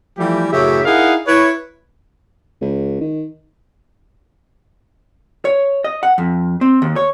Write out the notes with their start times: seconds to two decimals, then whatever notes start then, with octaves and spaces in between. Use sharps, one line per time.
0.18 E3 F3 G3 A3 G4
0.53 F#2 A2 C#3 G4 E5
0.85 D#4 E4 G#4 A#4 F5 F#5
1.27 E4 B4 C#5
2.61 C#2
3.00 D#3
5.45 C#5
5.84 D#5
6.03 F#5
6.18 F2
6.61 C4
6.82 D#2
6.96 C#5